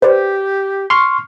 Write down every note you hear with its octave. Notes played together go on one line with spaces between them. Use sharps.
G4 B4 C5 D5
C6 C#6 F6